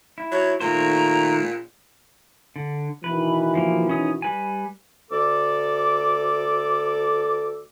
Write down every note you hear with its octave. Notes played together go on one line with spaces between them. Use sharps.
E4
F#3 C#5
A#2 D#3 A3 C5 A#5
D3
B2 D#3 E3 B4
F3 A#3
C#4 D#4 D#6
G3 B4 G#5
D2 A4 D5 D6